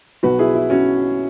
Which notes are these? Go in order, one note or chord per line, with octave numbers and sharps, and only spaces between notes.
B1 B2 B3 F#4 B4
E4 G#4
E4
C#4 F#4